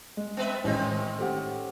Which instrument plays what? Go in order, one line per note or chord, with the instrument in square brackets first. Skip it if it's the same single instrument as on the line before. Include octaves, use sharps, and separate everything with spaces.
[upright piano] G#3
[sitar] B3 B4 E5
[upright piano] A1 G#3 [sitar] D#3 C4 C#4
[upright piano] A3 G4 F#5